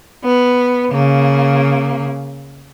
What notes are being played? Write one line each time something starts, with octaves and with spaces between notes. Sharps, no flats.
B3
C#3 A#3